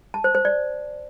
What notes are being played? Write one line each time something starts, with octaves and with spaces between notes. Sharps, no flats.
A5
C5
C5
D5